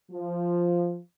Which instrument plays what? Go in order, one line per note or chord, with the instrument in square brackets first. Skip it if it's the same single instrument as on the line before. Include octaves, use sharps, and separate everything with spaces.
[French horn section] F3